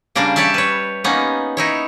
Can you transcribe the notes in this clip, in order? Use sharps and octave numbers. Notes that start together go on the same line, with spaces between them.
C#3 G3 A#3 D4
G4 C#5 D5 E5 A5
B4 C#5
A#3 B3 C#4 D#4
D#4 E4 C#5